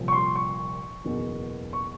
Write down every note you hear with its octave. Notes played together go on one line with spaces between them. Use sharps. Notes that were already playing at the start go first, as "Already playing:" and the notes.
Already playing: C2 A#2 F3
C#6
C6
C#6
F#1 E2 B2
C#6